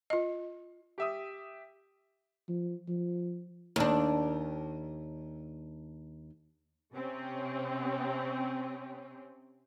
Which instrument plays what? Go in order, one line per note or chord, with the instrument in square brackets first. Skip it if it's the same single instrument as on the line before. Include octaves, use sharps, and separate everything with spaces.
[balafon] F4 D#5
[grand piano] G4 E5 D#6
[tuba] F3
F3
[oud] D#2 D4
[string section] C3 C4 C#4